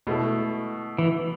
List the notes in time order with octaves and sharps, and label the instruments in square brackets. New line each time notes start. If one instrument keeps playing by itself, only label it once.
[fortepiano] B2 A3 E4 A4
[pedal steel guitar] E3